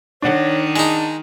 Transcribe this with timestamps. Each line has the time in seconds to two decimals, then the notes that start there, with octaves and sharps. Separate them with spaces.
0.22 D#3 D4 C#5 F#5
0.76 G#3 D#4 A5